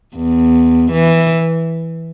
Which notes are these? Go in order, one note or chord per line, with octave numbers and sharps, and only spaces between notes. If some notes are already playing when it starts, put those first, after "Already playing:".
E2
E3